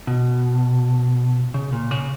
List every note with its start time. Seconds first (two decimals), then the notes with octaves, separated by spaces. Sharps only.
0.07 B2
1.54 C#3
1.73 A#2
1.91 C#3